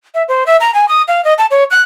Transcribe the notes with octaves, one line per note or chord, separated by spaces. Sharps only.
E5
C5
E5
A#5
G#5
D#6
F5
D#5
A5
C#5
F#6